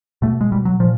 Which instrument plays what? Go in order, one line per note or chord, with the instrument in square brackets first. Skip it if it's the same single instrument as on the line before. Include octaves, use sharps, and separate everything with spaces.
[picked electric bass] B2 A3
G#3
B2 G3
F#3
A#2 F3